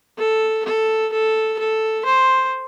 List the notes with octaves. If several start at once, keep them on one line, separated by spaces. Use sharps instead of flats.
A4
A4
A4
A4
C5